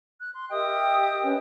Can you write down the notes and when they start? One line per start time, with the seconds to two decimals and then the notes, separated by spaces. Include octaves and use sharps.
0.21 F#6
0.35 C6
0.51 G4 A#4 D#5 E5 G5 D#6
1.22 C#4 B4